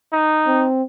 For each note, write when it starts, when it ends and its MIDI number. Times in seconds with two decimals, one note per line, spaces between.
0.13 0.66 63
0.47 0.83 60